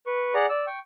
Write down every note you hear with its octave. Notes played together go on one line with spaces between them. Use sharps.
B4 C#6
G#4 D5 F#5 A#5
D5 E6
G5 C#6